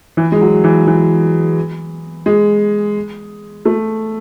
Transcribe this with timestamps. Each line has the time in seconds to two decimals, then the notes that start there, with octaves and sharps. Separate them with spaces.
0.17 E3
0.32 G#3
0.41 F#3
0.64 E3
0.87 E3
2.26 G#3
3.65 A3